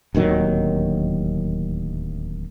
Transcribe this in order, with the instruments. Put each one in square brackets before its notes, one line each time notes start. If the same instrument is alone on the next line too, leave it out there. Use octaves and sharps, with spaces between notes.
[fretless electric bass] D1 D#2 D#3 F#3